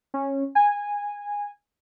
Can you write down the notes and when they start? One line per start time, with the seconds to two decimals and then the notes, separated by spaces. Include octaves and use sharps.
0.14 C#4
0.55 G#5